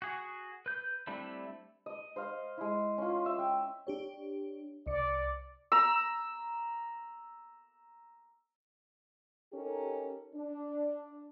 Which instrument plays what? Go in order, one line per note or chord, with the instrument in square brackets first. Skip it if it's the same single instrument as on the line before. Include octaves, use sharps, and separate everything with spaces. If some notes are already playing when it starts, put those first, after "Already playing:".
[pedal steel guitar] F#4 G#4
B4 G6
G3 A3 C4 D4 E4
[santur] D#5
C5 D#5 F5
G#3 E4
C#4 F4
E5
G5
[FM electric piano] D4 G4 C#5
[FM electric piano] C2 C#7 [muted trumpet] D5
[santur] A#5 E6
[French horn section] C#4 D#4 G4 A4 A#4
D4